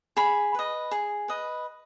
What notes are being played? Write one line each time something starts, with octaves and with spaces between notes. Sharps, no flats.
G#4 B5
B4 D#5
G#4
B4 D#5